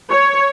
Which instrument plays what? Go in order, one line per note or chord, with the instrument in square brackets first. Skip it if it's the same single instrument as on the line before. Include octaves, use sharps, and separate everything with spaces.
[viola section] C#5